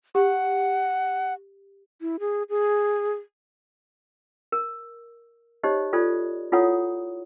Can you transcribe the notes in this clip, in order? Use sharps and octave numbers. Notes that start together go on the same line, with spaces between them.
G4 F#5
E4
G#4
G#4
A#4
D#4 G4 C5 C#5 D#5
F4 A4 C5 D5
E4 F4 A4 C#5 F#5 D#6